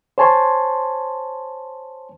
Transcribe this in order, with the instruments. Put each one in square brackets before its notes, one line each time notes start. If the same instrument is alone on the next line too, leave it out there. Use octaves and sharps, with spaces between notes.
[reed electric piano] C5 C#5 G#5 A5 C6